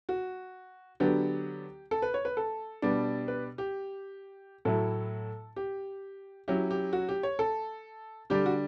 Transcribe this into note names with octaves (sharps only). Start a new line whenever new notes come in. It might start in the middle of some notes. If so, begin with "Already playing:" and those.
F#4
D3 F#3 B3 D4 G4
A4
B4
C#5
B4
A4
B2 G3 B3 D4
B4
G4
A2 F#3 A3 E4 A4
G4
F#3 C#4 E4 G4
G4
F#4
G4
C#5
A4
D3 G3 D4 G4
F#4